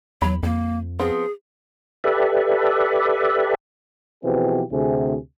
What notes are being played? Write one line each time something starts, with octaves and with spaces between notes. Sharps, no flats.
E2 F#3 B5
F2 A#3
F3 B3 C4 G#4
G4 A4 B4 D5 E5
B2 E3 F3 C4 G4 G#4
D2 C3 G#4